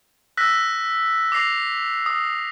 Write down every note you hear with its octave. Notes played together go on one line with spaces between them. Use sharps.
E6 F#6 A#6 B6
D6 A#6 C7 F7
D#6